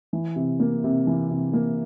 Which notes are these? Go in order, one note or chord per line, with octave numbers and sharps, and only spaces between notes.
E3
C3
A#3
C3
E3
C3
A#3